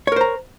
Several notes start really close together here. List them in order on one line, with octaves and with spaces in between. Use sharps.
C#5 A#4 C5 A#5